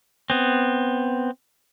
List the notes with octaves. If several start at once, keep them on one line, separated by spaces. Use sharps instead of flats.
B3 C4